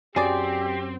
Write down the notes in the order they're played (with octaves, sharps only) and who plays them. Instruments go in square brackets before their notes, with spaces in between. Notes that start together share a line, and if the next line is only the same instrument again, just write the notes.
[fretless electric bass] F#2 F#3 [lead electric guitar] C4 [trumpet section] G4 [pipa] G#4 D5